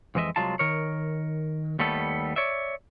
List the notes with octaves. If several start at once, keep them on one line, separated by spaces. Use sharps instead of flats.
F2 E3 G#3 D#5 E5
C2 F#3 G#3 F4 A5
D#3 A#4 C#5
D#2 G3 A3 B3 A4
C#5 D5 E5